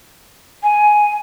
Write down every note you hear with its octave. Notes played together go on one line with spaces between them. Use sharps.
G#5